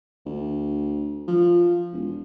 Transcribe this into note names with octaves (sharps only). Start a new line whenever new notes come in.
D2
F3
E1